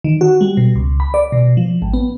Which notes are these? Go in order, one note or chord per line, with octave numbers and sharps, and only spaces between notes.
D#3
F#4
G3
B2
C#2
B5
D5
B2
F3
G#1
B3